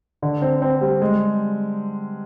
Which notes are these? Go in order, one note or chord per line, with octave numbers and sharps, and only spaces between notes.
D3
C4
C4
G3
G#3